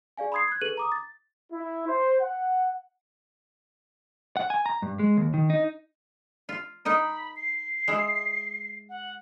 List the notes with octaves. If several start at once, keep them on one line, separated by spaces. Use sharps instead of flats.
G#4 D5 F5 G#5
B5 C6 D#6 G#6 C7
F#6 G#6
G#4 A4 B4 D#7 F#7
A#5 D6 D#6
A6
E4
C5
F#5
F#5
G#5
A#5
G2
G#3
D#2
D#3
D#4
F4
D#4 A#4 D#5 B5
C7
G#3 E4
F#5